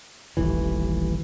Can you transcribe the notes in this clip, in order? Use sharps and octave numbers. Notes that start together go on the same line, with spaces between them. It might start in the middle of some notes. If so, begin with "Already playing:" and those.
D#1 A1 E3